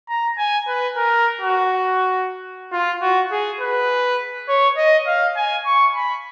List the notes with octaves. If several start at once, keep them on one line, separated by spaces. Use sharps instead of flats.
A#5
G#5
B4
A#4
F#4
F4
F#4
G#4
B4
C#5
D#5
F5
G#5
C#6
B5